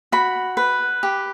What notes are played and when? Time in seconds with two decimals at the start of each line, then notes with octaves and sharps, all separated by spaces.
0.12 F#4 B5
0.57 B4
1.03 G4